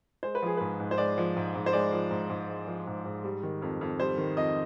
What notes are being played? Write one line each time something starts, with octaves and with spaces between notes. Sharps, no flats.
G#3 C5
B4
F3 G#4
G#2 B4
G#2
C5
G#3 D5
F3
G#2
G#2
C5
G#3 D5
F3
G#2
G#2
G#3
F3
G#2
G#2
G3
D#3
F2
F2
G3 C5
D#3
F2 D#5